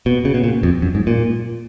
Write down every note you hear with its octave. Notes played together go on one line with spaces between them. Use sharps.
B2
C#3
B2
A#2
F2
F#2
G#2
A#2